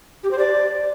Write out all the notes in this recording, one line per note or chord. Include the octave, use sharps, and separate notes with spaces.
G4
C5
D5